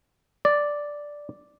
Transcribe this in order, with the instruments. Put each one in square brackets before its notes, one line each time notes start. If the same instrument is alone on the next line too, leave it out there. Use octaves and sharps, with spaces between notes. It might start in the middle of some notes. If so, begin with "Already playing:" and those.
[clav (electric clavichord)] D5